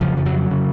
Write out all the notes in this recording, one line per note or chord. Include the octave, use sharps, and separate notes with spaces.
F2 C#3 F3
F3
F#3
C#3